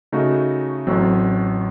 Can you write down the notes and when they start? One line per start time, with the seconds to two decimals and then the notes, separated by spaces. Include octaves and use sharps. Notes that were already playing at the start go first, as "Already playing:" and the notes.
0.12 C#3 A3 D#4 F#4
0.87 A1 A2 F#3 C4